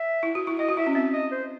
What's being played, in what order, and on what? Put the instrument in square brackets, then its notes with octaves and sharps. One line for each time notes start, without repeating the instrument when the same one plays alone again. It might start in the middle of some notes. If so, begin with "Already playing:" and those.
Already playing: [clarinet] E5
[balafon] E4
F#4
E4
[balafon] E4 [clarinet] D#5
[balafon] F#4
[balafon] E4 [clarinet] E5
[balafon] C#4
[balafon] C4 [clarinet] E5
[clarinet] D#5
C5